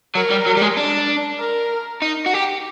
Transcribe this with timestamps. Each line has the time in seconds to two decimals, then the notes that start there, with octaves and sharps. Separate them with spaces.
0.15 F#3 A#4
0.30 G3
0.46 F#3
0.57 G3
0.62 G#3
0.77 D4
1.40 A#4
2.02 D#4
2.26 F#4
2.33 G4